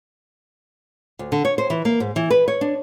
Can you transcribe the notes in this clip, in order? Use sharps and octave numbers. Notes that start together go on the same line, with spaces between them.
D2
D3
C#5
C5
E3
A#3
G#2
E3
B4
C#5
D4